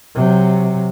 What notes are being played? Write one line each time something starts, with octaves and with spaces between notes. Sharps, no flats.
C3 F#3